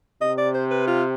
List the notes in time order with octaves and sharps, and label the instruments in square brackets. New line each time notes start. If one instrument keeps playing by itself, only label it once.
[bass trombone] C3 [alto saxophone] D#5
[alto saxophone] D5
C5
B4
F4